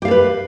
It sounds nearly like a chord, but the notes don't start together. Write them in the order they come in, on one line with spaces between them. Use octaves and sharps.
G4 F5 A4 B4